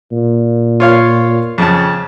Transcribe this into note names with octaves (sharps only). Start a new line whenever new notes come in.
A#2
F4 C#5 F5
F2 C#3 A5